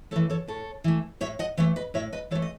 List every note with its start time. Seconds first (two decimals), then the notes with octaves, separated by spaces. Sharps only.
0.11 A3 A4 C#5
0.16 E3
0.30 A4 C#5
0.47 A2 A4 C#5
0.84 E3 A3
1.21 A2 C#5 E5
1.39 D#5 F#5
1.57 E3 A3 C#5 E5
1.76 B4 D#5
1.94 A2 C#5 E5
2.13 B4 D#5
2.31 E3 A4 C#5
2.35 A3
2.42 D#5